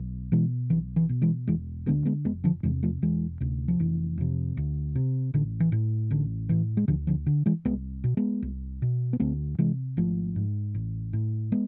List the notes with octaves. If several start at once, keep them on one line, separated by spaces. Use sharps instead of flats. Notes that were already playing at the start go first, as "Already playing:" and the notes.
Already playing: B1
B2 E3 G#3
B1 E3
E3
B2
E3 G#3
E1 E3 G#3
D2 D3 G#3 B3
G#3 B3
F1 G#3 B3
D3 F3
E2 C3 E3 G#3
F3 A3
E1 E3 G#3
D2 C3
F3
F1 E3
F2 C3
D2
C3
A1 D3
E3
A2
A1 D3
A2 E3
G#3
D2 D3 F3
D3 F3
D3
E3 G#3
C2 G#3 B3
B2
G#3 B3
C2
B2
B3
D2 A3 C4
C3 E3 G#3
G#1 F3 A3
G#2
A1
A2
G#3 B3